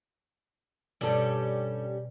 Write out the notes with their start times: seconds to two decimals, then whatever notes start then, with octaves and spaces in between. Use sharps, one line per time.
1.01 G2 B2 G3 C#4 A4